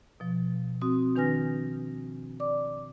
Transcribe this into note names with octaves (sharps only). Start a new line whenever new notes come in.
B2 F3
C4 F#4 D#6
D#3 D4 B4 G#5 F6 A#6
D5 D6